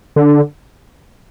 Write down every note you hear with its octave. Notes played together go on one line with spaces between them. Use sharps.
D3